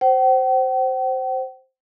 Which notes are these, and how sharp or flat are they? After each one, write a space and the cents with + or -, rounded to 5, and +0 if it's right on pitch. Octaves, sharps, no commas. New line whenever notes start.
C5 +0 G5 -45